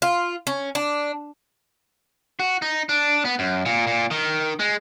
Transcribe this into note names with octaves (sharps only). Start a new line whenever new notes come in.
F4
C#4
D4
F#4
D#4
D4
B3
F#2
A#2
A#2
D#3
G#3